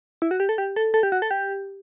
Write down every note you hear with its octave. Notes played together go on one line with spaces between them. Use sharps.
E4
F#4
G4
A4
G4
A4
A4
G4
F#4
A4
G4